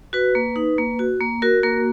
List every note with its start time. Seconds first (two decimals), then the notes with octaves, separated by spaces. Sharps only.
0.13 F#4 B4
0.35 A#3
0.56 D#4
0.78 A#3
0.99 F#4
1.21 A#3
1.42 F#4 A#4
1.63 A#3 A#4